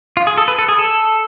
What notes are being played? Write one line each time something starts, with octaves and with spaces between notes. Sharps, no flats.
F4
G#4
A4
B4
A4
G#4
A4